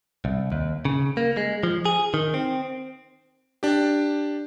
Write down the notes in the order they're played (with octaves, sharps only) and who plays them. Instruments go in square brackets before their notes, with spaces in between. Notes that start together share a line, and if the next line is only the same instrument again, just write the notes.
[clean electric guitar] C2
D#2
C#3
A#3
G#3
F3
G#4
D#3
C4
[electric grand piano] D4 G4